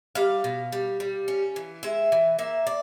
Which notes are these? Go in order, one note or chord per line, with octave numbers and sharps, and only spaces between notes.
G3 F5
B2
G3
G3
C#4
E3
G#3 E5
E3
A#3 E5
D5